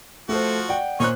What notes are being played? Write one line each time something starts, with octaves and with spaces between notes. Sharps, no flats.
F3 A3 F#4 A4 C5
D5 F#5 G5
A#2 C#4 D#4 C5 C#6 F#6